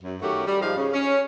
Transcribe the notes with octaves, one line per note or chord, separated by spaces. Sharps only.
F#2
D#3 A3 C#4 F#4 G4
G3
G#2 F3 D#4 F5
C#3
C#4